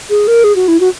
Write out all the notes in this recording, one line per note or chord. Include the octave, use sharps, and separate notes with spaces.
G#4
A#4
G#4
F#4
E4
F#4